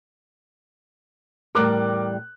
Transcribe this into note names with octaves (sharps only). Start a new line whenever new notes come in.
E2 A2 G3 A#4 D6 F#6